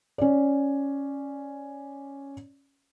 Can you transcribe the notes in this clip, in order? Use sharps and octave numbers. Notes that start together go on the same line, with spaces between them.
C#4 D5